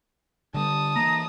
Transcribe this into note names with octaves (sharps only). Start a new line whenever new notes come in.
D3 G3 A5 D#6
E3 A#3 A#5